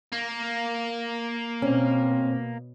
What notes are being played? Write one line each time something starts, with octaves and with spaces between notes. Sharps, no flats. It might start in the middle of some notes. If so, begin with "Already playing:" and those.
A#3
B2 C4 C#4